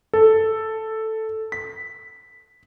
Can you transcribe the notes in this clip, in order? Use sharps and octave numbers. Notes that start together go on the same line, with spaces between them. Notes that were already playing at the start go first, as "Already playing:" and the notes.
A4
B6